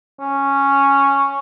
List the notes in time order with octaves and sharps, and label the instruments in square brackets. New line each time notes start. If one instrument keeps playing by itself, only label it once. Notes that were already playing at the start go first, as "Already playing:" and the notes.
[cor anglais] C#4